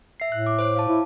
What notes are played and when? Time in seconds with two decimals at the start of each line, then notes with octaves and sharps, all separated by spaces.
0.20 E5 C7
0.32 A2 F#6
0.46 D6
0.59 C5 C#5 D6
0.76 F5 A5
0.88 E4